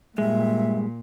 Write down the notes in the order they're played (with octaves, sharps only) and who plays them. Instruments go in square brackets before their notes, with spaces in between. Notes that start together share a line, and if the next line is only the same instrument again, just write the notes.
[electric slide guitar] G2 G#3 [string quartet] A#2 [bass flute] E5